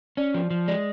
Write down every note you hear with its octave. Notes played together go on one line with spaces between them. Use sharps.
C#4 D5
F3
F3
G#3 D5